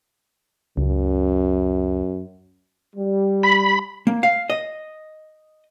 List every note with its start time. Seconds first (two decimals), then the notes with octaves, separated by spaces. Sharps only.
0.77 C#2 F#2
2.96 G3
3.43 B5
4.07 A#3
4.23 F5
4.50 D#5